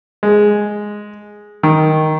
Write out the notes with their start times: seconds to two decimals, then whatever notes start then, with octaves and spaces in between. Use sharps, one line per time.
0.23 G#3
1.63 D#3